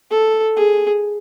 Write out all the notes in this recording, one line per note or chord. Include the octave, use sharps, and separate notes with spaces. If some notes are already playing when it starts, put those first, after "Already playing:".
A4
G#4